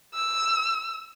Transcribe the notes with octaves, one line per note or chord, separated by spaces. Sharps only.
E6